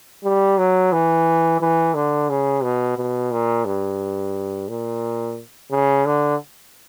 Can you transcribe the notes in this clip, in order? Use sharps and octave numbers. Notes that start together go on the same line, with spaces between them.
G3
F#3
E3
E3
D3
C#3
B2
B2
A#2
G2
A#2
C#3
D3